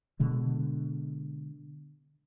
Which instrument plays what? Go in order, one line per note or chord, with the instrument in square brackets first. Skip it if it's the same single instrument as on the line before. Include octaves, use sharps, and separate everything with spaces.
[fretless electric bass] B2 D3 G#3